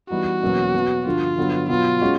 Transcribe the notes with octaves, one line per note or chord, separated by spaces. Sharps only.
E3 G3 B3 D#4 F#4
E2 B2 F#3 A#3 C#4
B2 F#3 B3
G2 D3 F3 F4
G2 D3 F#3 B3
B2 F#3 B3 F4
G#3 C#4 F#4